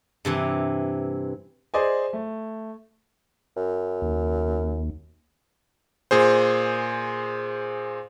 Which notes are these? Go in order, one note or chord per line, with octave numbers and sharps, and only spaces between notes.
G2 C3 E3
G#4 C5 D5 D#5 G#5
A3
F#2
D#2
A#2 G#4 C5